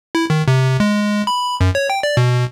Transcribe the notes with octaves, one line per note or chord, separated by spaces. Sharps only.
E4
D#3
C3
G#3
B5
F#2
C#5
G5
D5
B2